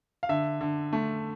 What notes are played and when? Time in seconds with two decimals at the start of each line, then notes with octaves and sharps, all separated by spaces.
0.23 F5
0.29 D3 E5
0.61 D3
0.93 A3